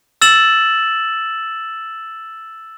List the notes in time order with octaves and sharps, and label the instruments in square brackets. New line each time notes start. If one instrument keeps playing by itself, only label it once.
[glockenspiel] E6 A6 E7 F#7